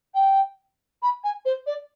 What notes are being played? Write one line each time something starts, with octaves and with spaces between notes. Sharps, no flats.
G5
B5
G#5
C5
D5